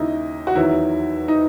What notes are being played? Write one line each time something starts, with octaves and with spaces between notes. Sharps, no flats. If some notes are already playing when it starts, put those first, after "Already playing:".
Already playing: D#2 C#3 F#3 D#4 E4
F#4
E2 D#3 F#3 E4
D#4